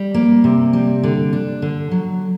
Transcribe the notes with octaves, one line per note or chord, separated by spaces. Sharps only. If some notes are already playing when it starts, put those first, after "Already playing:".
Already playing: G3
A#3
C3
G3
D3
D4
D3
F#3